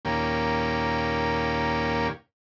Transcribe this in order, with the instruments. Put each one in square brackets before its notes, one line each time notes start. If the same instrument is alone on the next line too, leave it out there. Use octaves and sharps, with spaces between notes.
[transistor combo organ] D#2 A#2 A#3 C#4 G4